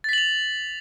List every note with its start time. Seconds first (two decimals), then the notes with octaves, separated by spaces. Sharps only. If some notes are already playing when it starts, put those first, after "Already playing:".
0.04 A6
0.09 B6
0.13 F#7
0.18 F7